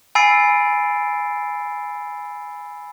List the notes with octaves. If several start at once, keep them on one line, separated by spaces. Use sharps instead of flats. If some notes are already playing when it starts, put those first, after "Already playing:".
G#5 B5 E6 A6 C7 D7